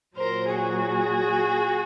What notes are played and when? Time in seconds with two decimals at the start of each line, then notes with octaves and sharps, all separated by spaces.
0.17 A#2 F#3 A#4 C5
0.55 F#4 G#4